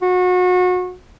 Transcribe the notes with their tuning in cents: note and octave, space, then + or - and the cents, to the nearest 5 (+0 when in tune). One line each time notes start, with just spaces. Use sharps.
F#4 -30